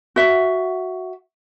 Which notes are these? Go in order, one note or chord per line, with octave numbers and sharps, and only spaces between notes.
F#4 E5